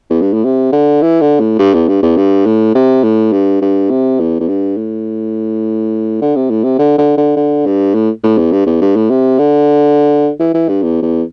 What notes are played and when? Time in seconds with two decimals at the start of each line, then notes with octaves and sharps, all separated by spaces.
0.10 E2
0.21 G2
0.33 A2
0.44 C3
0.72 D3
1.02 E3
1.21 D3
1.40 A2
1.59 G2
1.74 E2
1.88 G2
2.03 E2
2.17 G2
2.46 A2
2.75 C3
3.04 A2
3.33 G2
3.62 G2
3.90 C3
4.19 E2
4.40 E2
4.48 G2
4.77 A2
6.22 D3
6.36 C3
6.50 A2
6.64 C3
6.79 D3
6.98 D3
7.17 D3
7.36 D3
7.66 G2
7.95 A2
8.23 A2
8.38 E2
8.52 G2
8.66 E2
8.82 G2
8.96 A2
9.10 C3
9.39 D3
10.40 E3
10.54 E3
10.68 G2
10.83 E2
11.02 E2